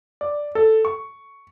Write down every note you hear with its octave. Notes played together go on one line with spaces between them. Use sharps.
D5
A4
C#6